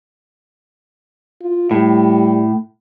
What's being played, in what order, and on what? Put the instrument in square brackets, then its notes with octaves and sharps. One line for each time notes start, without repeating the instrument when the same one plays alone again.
[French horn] F4
[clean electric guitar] A2 [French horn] G3